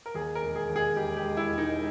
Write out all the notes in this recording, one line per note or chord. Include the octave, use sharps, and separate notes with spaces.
A#4
D#2 G#4
A#4
E1
G#4
D#2
G#4
E1 G4
G4
G#3
E4
E1
D#4